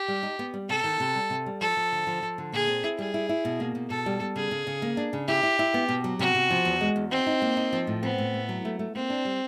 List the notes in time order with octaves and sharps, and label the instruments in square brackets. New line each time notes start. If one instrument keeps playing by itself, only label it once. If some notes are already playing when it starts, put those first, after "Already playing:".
Already playing: [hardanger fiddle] G4
[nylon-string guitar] G3
D#4
B3
G3
[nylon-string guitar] C3 [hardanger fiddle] A4
[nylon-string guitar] D#3
C3
G3
C3
G3
[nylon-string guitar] F3 [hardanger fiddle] A4
[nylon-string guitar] F3
D3
F3
F3
D3
[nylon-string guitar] A#2 [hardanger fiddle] G#4
[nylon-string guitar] C4
E4
[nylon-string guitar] G3 [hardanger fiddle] G#4
[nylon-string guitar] E4
E4
B2
A#3
B2
[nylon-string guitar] B2 [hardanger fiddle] A4
[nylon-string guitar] G3
G3
[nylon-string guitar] C#3 [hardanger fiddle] G#4
[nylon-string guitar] C#3
C#3
A#3
D4
C#3
[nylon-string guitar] E4 [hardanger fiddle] G4
[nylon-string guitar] E4
E4
B3
B2
F#3
[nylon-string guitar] C3 [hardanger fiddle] F#4
[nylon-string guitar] C3
F3
E2
G#3
E2
[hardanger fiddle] C4 [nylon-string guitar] D#4
[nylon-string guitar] D#4
A#3
D#4
F3
A2
[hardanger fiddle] B3 [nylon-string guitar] C4
[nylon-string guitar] A2
A3
F#3
A3
A3
[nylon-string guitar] A#3 [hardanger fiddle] C4
[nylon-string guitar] D4
G3